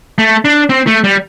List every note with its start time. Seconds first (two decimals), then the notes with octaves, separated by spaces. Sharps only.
0.18 A3
0.45 D4
0.69 C4
0.87 A3
1.04 G3